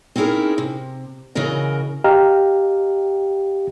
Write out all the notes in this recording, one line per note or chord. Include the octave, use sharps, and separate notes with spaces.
C4 C#4 D#4 E4 G#4 A#4
C3
C#3 E3 F#4 A#4 D#5
G4 D#5 F5 G5 A#5 F6